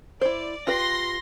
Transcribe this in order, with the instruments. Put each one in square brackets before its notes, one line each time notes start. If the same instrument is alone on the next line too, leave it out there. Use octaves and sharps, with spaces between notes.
[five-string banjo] E4 C5 [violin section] D5
[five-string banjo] F4 G4 B4 [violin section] C6 A#6